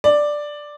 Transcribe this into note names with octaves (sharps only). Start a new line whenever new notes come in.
D5